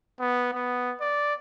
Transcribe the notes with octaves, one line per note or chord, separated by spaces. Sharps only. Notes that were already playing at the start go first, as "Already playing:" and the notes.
B3
B3
D5